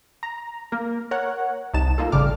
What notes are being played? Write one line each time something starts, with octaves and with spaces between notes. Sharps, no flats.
A#5
A#3 A#4
A#4 C#5 F#5
C2 D#4 A5 E7
A#3 D#4 F4 A4
A1 A2 C#3 G3 D6 F6